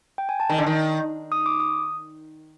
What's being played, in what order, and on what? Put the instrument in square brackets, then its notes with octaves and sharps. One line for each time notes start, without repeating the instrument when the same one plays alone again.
[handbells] G5
G#5
A5
[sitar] D#3 [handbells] A#5
[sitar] D3
D#3
[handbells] D#6
D6
D#6